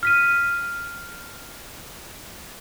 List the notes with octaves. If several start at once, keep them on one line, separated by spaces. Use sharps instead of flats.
F6 B6 D#7